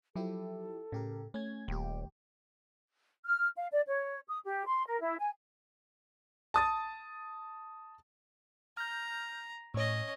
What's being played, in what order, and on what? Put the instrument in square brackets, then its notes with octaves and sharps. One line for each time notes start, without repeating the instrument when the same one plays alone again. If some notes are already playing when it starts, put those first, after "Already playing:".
[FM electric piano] F3 E4 G4 [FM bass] F#3 [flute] A4
[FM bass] A2 [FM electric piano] C#3 G4 A#4
[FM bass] A3 [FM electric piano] C#4 G#6
[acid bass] D#1 [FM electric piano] D#2 G4 [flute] G5
[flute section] F6
F5
D5
C#5
D#6
G4
C6
A#4
E4
G#5
[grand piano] A5 D#6 A6
[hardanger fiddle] A#5 [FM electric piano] F6 G6
[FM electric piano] A2 C#5 [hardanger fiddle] C#4 D#5